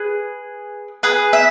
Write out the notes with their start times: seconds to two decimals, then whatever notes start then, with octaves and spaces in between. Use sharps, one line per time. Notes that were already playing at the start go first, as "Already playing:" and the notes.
Already playing: G#4 B4
1.03 G#4 B4
1.33 E5